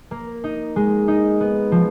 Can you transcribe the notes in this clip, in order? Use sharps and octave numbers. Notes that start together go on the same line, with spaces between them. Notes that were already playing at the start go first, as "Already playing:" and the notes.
A#3
D#4
G#3
D#4
B3
F3